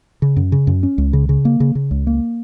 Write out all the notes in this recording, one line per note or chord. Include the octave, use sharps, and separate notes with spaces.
C#3
F#2
C#3
F#2
C#4
C#2
C#3
C#3
A#3
C#3
C#3
C#2
A#3